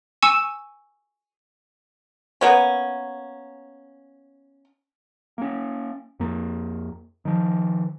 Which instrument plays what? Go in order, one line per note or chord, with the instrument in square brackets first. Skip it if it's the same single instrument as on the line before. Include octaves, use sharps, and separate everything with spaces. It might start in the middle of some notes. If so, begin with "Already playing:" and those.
[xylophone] G#5 C#6 E6 C#7 D#7 E7
[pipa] A#3 B3 C#4
[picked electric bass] A#3 C#4
F2 A#3
D#3 F3